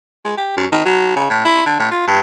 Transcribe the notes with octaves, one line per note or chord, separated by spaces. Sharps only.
G#3
G4
F#2
D#3
F#3
C#3
A2
E4
D3
A2
F4
G2